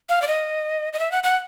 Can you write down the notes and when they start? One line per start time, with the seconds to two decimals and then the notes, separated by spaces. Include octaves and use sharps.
0.09 F5
0.22 D5
0.28 D#5
0.93 D#5
0.99 E5
1.12 F#5
1.23 F#5